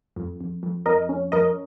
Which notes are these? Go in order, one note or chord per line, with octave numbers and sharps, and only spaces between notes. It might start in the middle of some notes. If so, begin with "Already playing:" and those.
F2
F2
F2
F2 A#4 D#5
C#4
F2 A#4 D#5